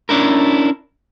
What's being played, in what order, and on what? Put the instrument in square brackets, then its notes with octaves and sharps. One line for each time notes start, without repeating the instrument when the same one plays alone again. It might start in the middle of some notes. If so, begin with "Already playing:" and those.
[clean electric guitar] C#4 D4 E4 A#4